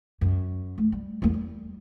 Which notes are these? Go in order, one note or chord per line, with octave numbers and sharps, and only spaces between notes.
F#2
A3
G3
E2 A#3
G3